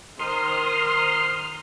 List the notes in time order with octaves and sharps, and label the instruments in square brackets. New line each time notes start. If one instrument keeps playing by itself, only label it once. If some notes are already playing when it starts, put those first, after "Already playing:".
[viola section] D#3 C5 A#5 [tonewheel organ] C6 D#6 F6